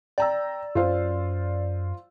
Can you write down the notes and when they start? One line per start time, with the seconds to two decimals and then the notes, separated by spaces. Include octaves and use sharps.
0.18 D5 G5 A#5 E6
0.75 F#2 C#4 F4 C5 F5